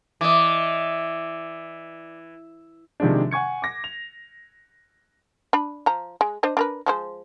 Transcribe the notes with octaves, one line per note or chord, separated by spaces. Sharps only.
E3 D5 D#5
C3 D#3 F3 G#3 D4
F#5 G#5 C#6 G#6 C#7
D6 A#6
F7
D4 B5
F3 A#5
G#3
D4 C5 D#5
D4 A#4 B4
F3 G#3 C5